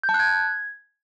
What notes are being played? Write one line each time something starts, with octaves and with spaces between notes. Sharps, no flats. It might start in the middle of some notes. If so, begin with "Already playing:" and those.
G6
A5
F#6
G#6